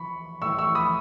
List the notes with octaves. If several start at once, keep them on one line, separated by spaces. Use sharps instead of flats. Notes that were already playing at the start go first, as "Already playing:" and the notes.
Already playing: E3 B5 C#6
A2 E3 C#6 E6
C#6 E6
B5 D#6